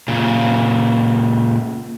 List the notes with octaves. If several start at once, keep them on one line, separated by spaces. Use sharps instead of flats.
A#2 C#3